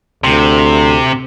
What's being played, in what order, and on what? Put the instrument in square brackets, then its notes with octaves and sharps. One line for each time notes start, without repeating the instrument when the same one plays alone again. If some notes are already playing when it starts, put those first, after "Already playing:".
[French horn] D2 [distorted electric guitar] C3